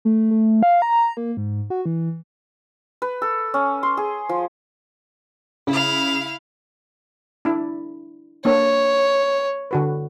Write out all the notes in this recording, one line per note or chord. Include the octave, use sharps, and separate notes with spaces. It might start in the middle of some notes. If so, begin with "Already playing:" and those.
A3
A3
F5
A#5
A#3
G#2
F#4
E3
B4
A4
C#4
C6
G#4
F3
C#3 E4 F5
D4 E4
A#3 D4 C#5
D3 F#4 B4